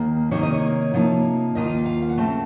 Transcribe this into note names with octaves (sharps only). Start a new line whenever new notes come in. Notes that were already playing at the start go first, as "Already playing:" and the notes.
Already playing: D#2 D#3 A#3
C3 D#3 A#3 D#4 C#5
D#5
C#5
C3 F3 A#3 D#4
D#2 D#3 A#3 F4 D#5
F5
F5
F#5
C#3 A3 C4 A5